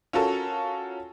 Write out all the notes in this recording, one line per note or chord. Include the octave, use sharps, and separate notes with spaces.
C#4 F4 F#4 A4 A#4